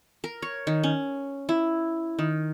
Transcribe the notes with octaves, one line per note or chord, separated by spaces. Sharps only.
A#4
C#5
D#3
C#4
E4
D#3